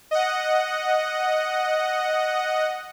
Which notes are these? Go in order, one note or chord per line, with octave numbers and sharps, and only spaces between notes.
D#5 F#5